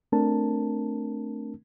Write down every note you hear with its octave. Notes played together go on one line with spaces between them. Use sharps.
A3 C4 D4 A#4 A5